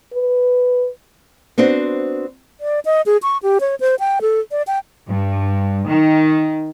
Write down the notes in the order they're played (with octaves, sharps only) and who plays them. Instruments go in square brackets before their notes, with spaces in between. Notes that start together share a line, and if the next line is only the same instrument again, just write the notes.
[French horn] B4
[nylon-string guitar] B3 C4 D4 F#4 C5
[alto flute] D5
D#5
G#4
C#6
G4
C#5
C5
G5
A4
D5
G5
[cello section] G2
D#3